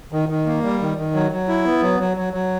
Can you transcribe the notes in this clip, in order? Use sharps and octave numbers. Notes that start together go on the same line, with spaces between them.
D#3
D#3
A#3
G3
D#3
D#3
F#3
F#3
E4
B3
F#3
F#3
F#3
F#3